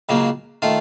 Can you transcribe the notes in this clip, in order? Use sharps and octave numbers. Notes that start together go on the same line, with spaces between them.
C#2 C#3 F#3 A#3
D#3 A3 F4